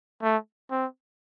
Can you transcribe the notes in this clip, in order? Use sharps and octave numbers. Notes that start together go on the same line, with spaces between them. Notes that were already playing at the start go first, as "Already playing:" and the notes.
A3
C4